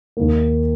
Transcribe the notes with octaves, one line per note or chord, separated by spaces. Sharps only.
D#2 D#3 A#3